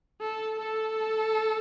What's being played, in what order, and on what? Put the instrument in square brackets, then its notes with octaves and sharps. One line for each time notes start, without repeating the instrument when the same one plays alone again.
[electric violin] A4
A4